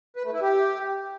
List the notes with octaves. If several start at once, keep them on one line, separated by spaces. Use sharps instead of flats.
B4
A3
E4
G4